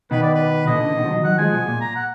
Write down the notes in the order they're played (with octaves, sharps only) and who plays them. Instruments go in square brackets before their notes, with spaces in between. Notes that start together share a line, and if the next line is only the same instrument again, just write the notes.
[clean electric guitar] B2 D#3 [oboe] B4
[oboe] D5
B4
[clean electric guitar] A#2 D3 [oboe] D#5
[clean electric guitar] D3
B2 D#3
F3
D#3 F#3
[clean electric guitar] D#3 F#3 [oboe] F#5
[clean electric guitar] F3 G#3 [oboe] G#5
[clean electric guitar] B2
A#2
[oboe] A#5
F#5